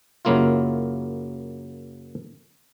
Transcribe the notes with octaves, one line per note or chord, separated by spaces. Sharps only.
F#2 C#3 F#3 A#3 E4 F4